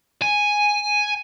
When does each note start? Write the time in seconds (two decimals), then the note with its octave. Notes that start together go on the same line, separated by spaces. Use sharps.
0.22 G#5